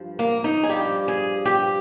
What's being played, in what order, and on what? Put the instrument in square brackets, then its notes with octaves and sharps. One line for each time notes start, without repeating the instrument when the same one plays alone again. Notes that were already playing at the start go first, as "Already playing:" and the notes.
Already playing: [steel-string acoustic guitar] G2 F3
A#3
D#4
G#4
G2 F3 G4
G#4
G4